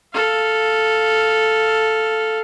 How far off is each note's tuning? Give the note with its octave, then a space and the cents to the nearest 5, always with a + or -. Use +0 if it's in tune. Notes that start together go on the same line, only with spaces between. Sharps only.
A4 +0 F5 +0